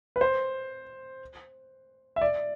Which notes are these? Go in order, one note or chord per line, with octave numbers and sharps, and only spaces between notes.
B4
C5
E5
D5